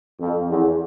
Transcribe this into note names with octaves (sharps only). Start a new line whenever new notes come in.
F2
E2